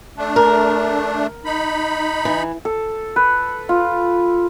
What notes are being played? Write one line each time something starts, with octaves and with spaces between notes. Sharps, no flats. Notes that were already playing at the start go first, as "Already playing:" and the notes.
A3 D4
A#4
D#4 B5
E3
A4
B4
F4